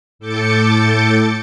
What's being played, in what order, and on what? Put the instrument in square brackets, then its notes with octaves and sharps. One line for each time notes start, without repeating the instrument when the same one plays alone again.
[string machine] A2 A4 D6 G6 A6 C#7